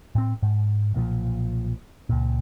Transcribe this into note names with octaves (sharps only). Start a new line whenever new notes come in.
A2 C4
G#2
B1 A#2 D3 F3
C#2 A#2